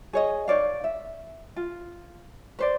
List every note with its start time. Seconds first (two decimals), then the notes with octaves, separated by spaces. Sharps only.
0.13 G#4 C#5 D#5
0.48 D#4 C#5 D5 F5
0.84 E5
1.56 F4
2.59 B4 C5 D5